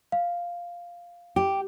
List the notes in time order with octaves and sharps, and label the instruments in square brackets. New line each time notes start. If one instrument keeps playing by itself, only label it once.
[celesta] F5
[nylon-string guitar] G4